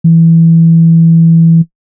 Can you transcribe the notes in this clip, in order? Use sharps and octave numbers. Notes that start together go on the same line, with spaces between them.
E3